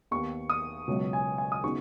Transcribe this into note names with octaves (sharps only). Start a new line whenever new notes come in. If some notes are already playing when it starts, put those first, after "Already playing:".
D#2 D#3 B3 C#6
D#6
C#2 B2 F#3
G#5
G#5
D#6
C#3 B3 D#4 F#4 C#6